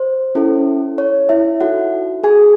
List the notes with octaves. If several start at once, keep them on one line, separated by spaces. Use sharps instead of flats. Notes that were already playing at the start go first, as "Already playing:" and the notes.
Already playing: C5
C#4 E4 A4
C#5
E4 E5
D#4 F#4 A4 F#5
G#4 G#5